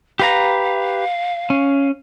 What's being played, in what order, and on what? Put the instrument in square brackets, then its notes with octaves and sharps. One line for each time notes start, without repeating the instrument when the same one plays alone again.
[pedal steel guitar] G4 B4 A#5 [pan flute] F5
[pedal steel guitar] C#4